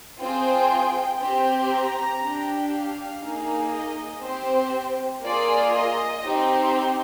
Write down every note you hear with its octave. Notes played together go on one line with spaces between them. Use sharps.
C4 F4 G#4 G5
C4 G4
A#5
D4 G4
F5
A#3 D#4 G#4
D#5
C4 G4 C5
A#3 F4 G#4 D5
D#5
C4 D#4 G4